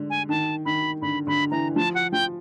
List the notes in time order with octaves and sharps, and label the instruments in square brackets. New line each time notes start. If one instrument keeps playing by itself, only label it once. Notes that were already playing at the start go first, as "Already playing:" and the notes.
Already playing: [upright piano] G#2 D3
[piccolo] G#5
[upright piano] D#3 [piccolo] A5
[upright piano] D#3 [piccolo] B5
[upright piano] D3 [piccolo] B5
[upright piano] D3 [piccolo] B5
[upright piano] E3 [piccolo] A#5
[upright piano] F3 [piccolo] A5
[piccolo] F#5
[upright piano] F3 [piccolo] G5